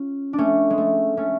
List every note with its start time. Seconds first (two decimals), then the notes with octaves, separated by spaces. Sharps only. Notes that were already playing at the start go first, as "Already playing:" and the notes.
Already playing: C#4 F4
0.33 D4
0.38 A3 C#4
0.70 G#3
0.78 A3
1.17 A3 C#4